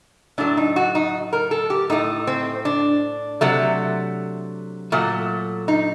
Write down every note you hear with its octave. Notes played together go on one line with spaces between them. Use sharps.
A2 F#3 A3 D4
D#4
F#4
D#4
A#4
A4
G4
A2 A3 D#4
C4
D4
C3 F#3 A3
A#2 F#3 A3
D#4